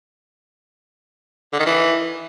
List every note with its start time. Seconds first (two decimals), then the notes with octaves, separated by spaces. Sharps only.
1.53 D3
1.59 D#3
1.66 E3